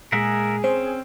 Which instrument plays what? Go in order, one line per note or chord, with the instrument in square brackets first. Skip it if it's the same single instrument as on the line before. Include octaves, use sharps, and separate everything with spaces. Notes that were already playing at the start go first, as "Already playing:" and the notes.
[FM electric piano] A#2 G#3 [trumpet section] G#4 [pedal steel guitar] A#4 E5 F#5
[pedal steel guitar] C4 C#4 [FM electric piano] C5